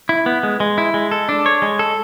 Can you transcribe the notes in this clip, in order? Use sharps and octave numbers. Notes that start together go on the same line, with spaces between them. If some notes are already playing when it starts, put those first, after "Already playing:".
E4
B3
G#3
G#3
E4
G#3
A4
D4
C#5
G#3
A4